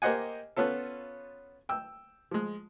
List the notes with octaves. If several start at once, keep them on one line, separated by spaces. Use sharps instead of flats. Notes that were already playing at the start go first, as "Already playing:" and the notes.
A#3 G4 C5 D#5 F#5 G#5
B3 C#4 F4 A4
G5 E6
F3 G#3